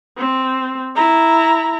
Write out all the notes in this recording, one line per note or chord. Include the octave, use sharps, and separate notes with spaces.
C4
E4 A#5